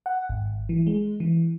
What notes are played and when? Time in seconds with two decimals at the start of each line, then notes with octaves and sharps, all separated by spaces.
0.06 F#5
0.30 G#1
0.69 E3
0.87 G#3
1.20 E3